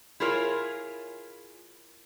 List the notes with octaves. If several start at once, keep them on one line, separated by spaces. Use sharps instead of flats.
E4 F4 G#4 A#4 C#5